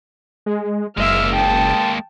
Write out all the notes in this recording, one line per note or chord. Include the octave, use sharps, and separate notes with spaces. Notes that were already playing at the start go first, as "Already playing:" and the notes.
G#3
F#1 G#3 A#3 E5 F6
G5 A5